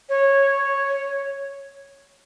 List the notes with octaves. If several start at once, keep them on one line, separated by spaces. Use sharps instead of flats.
C#5